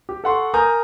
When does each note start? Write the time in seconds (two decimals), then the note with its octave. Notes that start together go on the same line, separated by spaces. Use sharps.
0.09 G4
0.24 A4 F#5 C6 C#6
0.54 A#4 G#5 A#5 D#6 G6